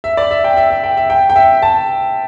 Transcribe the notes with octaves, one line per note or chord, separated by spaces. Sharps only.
E5
D5
E5
G5
E5
E5
G5
E5
G5
G5
E5
A5